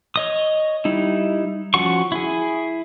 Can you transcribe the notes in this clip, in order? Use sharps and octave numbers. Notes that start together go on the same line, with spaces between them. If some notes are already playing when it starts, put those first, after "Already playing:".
C#5 D#5 D#6
G3 D#4 E4
F3 C#4 F#4 F#5 C#6
E4 G#4